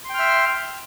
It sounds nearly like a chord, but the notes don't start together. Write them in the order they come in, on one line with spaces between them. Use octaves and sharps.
C6 G5 F6 E5